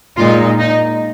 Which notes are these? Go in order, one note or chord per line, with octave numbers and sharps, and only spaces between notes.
A#2 G#3 D#4 F4
D#4